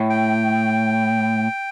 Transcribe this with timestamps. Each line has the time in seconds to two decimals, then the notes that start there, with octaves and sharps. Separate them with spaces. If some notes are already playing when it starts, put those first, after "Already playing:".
Already playing: A2
0.10 G5